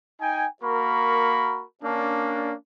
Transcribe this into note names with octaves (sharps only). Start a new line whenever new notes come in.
D#4 G5 G#5
A#3 F#4 A#4 B5 C#6
A#3 C#4 D4